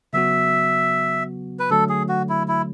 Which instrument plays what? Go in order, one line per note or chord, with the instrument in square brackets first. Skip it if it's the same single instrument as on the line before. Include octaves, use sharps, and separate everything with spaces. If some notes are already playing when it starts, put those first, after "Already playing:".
[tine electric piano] C#3 F#3 B3 F#4 [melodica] E5
[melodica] B4
[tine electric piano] D3 F#3 A3 [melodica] A4
[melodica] G#4
F#4
E4
E4